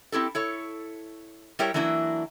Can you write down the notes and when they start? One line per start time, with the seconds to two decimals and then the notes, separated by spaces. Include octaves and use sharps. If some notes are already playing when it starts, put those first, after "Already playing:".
0.12 C4 E4 G4 A4
0.35 E4 A4 C#5
1.59 G3 E4 G4 A#4 C#5
1.74 E3 F#3 A#3 D4 E4